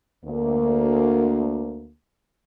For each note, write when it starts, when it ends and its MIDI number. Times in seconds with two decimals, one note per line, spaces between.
0.25 1.91 38
0.25 1.91 58